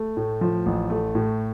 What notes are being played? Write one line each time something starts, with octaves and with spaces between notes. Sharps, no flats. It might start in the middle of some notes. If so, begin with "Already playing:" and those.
Already playing: A3
A2
F3
A1
A3
A2